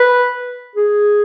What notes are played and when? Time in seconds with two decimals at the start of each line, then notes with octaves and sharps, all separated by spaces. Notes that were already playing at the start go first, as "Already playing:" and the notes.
Already playing: B4
0.76 G#4